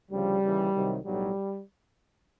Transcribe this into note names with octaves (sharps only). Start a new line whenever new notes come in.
D2 C#3 F3 G3
D#2 C#3 E3
C2 C3 D#3 F#3
B1 A2 F#3 G3